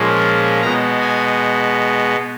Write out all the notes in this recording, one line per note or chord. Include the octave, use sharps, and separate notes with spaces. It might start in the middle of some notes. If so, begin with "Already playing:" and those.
Already playing: A#2 F3 G#3 C#4
B2 G#3 B3 A#5
G#5